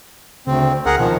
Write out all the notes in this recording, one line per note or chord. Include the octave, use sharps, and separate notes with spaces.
D2 C#3 C4
C#2 G#4 A#4 F#5
B2 D#3 F3